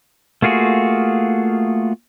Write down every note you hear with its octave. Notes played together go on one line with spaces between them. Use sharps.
A3 A#3 F4 F#4 G#4